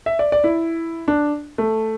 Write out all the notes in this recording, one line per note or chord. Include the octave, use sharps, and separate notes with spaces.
E5
D5
D5
E4
D4
A3